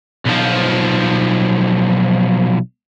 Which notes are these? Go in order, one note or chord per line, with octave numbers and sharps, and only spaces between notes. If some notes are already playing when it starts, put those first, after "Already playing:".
B1 F3